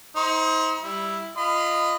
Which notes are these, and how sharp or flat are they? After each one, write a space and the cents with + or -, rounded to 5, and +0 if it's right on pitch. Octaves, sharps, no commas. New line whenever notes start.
D#4 +40 C5 +0 C6 +45
G3 +0 E4 +0
F4 -10 D#5 -10 B5 +30